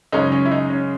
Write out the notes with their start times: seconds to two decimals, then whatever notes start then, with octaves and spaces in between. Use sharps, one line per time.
0.12 F#2 C#3 G#3 C#4 D#4
0.32 C#4
0.45 E4
0.51 D#4
0.70 C#4